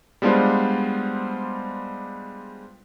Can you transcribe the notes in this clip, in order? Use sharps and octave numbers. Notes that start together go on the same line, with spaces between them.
G3 G#3 B3 D4 F4 C5